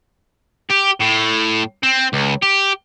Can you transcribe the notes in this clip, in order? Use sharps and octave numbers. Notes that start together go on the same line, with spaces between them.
G4
A2
C4
C#2
G4